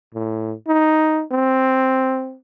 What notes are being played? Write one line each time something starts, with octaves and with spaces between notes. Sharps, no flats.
A2
D#4
C4